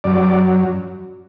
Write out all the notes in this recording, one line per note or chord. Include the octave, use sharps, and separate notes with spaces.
F#2 F#3 D5